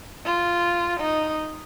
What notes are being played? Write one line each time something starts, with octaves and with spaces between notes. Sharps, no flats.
F4
D#4